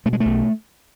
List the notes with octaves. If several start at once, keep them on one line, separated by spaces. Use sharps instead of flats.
B2 A3
G#3
A3
B1